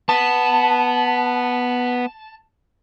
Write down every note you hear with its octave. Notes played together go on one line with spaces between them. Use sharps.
B3 A5